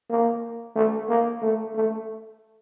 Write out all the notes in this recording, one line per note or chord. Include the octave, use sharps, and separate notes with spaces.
A#3
A3
A#3
A3
A3